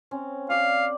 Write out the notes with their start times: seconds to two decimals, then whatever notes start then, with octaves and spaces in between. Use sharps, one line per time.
0.11 C4 C#4
0.50 G4 C5 D5 F5